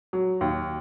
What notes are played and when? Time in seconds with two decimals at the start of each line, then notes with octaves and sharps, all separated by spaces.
0.13 F#3
0.41 D#2